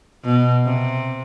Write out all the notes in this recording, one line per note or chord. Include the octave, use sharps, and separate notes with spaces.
B2
C3